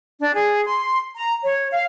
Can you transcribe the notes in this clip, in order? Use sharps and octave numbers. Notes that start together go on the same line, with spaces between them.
D4
G#4
C6
A#5
C#5
F5